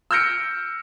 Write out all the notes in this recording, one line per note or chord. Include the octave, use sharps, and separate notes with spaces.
E6 F6 G6 A#6 C#7 D7